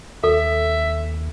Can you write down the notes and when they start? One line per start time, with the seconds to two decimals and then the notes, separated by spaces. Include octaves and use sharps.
0.24 D#2 A4 E5